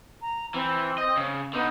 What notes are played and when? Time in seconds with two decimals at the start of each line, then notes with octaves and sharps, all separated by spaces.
0.21 A#5
0.54 E3 C4
0.98 D#5
1.17 C#3
1.53 D3 B3 D#4